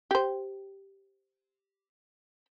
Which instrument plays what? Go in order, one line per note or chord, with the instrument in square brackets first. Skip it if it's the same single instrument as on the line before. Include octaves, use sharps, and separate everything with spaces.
[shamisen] G4 C5